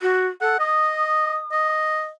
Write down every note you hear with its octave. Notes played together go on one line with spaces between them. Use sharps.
F#4
A4 F#5
D#5 D#6
D#5